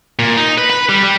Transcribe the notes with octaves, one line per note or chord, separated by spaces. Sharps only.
A#2
D#4
B4
B4
G3
G3